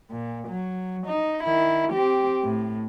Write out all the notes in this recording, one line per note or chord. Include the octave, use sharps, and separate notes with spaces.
A#2
F#3
D#4
D#3 E4
C4 G4
A2